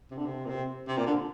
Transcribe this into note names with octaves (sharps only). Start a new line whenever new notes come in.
C3
D3
C3
A#2
C3
C3
A#2
D3